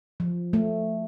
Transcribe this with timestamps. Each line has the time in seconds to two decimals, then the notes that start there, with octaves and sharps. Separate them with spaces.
0.20 F3
0.53 A3